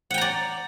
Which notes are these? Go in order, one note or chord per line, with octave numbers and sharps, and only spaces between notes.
D5 F#5 G5 A#5